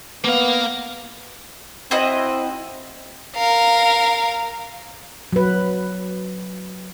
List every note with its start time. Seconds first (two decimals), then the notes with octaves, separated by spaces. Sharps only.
0.24 A#3 B3 F5
1.91 C4 E4 F#4 D#5
3.36 A#4 F5
5.33 F#3 B4